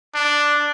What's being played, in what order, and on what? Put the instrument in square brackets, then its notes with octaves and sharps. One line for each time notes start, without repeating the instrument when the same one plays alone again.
[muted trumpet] D4